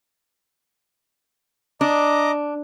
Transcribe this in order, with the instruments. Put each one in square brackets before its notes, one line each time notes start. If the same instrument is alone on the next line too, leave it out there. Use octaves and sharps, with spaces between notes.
[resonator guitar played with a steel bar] D4 [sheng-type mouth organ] D#5 A#5 D6